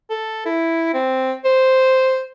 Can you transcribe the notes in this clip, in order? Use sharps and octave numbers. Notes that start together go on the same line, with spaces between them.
A4
E4
C4
C5